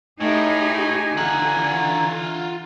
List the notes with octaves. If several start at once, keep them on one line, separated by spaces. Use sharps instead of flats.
A2 A3 D#4 G4 G#4 G#5
D3 E3 F4 F#5 A#5